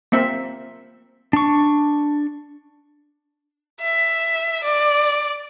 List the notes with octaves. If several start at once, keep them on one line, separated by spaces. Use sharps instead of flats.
A#3 C4 E5
D4 C#6
E5
D5